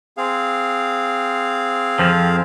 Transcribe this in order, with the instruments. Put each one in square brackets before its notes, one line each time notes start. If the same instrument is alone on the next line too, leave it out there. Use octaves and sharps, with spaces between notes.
[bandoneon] C4 G#4 F5
[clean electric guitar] F2 F3